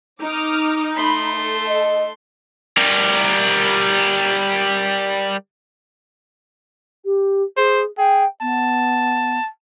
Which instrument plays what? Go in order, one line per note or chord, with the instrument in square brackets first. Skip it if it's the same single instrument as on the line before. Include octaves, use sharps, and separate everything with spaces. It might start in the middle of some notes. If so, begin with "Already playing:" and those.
[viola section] D#4 [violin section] D6 D#6 F6
[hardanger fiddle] A3 C6 [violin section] B5
[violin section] A4
[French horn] D#5
[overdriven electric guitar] G3 A#4
[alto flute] G4
[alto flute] G#4 [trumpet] C5
[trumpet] G#4 [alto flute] G5
[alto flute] B3 [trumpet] A5